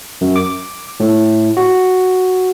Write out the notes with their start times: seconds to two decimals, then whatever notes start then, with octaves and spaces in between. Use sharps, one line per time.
0.21 F#2
0.36 D6
1.00 A2
1.57 F#4